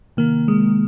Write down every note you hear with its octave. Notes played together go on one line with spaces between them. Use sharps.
C3 D#3 A#3
G#3